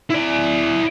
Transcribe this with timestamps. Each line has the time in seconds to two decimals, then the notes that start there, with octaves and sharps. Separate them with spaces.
0.10 E4 D5